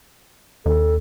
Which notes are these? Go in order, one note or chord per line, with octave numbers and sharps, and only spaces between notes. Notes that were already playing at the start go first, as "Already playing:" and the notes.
D#2 A4